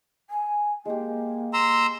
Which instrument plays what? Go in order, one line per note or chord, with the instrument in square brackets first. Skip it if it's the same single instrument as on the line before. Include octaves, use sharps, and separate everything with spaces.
[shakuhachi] G#5
[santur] G#3 G4 [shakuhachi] A#3
[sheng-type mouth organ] A#5 C6 E6